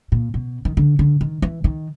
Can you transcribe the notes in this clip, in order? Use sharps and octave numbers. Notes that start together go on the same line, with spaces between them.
A#2
B2
D#3
D3
D3
D#3
E3
D#3